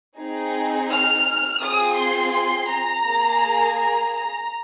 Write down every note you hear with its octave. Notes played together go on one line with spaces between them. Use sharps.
C4 D#4 G#4
F6
C4 F4 G#4 D#6
C6
C6
A#5
A#3 G#4
A#5
A#5